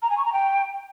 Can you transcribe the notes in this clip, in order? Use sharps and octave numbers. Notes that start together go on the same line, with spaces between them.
A#5
G#5
C#6
A#5
G5